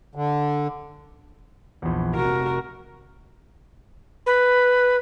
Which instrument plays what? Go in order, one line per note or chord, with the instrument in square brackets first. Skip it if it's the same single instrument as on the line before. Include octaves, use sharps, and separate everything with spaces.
[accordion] D3
[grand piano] A#1 E2
[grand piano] F1 [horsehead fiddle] F#4 A#4
[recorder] B4